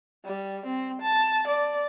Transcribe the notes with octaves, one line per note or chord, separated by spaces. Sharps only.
G3
C4
A5
D5